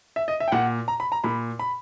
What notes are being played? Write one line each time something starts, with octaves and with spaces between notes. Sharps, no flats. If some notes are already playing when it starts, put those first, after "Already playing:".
E5
D#5
E5
G5
A#2 F#5
A#5
B5
A#5
A#2 B5
B5